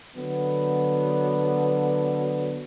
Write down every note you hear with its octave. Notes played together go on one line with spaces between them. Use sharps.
D3 F#3 B3